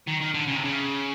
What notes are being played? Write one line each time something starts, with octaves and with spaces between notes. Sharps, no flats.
D#3
D#3
D3
C#3
C3
C#3